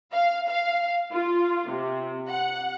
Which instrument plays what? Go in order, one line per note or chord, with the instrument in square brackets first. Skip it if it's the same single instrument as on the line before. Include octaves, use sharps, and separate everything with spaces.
[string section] F5
F5
F4
C3
F#5